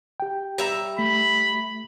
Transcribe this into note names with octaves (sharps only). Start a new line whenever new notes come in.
G4 G5
G3 E5 A#5
A3 B5